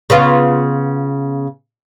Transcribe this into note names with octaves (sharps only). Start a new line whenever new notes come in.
C#3 B3 F4